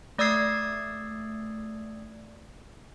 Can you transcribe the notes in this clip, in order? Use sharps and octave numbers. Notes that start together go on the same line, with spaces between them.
A3 D5 D#6 E6 G#6 C7